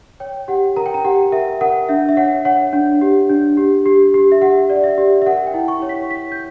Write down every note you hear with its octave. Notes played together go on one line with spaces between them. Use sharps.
C#5 G5
G4 F#5
A#4 A#5
G5
A#5
G4 F#5
A#4 E5
A#4 F#5
D4 E5
E5
C#5 F#5
C#5 F#5
D4
G4
D4
G4
G4
G4
E5
G4 F#5
D5
E5
G4
E5
A#4 F#5
G5
E4
C#6
C#5
B6
C#5 B6
G6